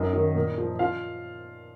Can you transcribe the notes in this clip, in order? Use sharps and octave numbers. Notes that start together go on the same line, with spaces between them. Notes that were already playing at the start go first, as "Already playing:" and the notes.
Already playing: F#2 D#4 D#5
D#3 F#3
A#2
F3
F4 F5